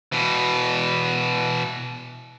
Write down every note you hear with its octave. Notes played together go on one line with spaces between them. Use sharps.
B2 E3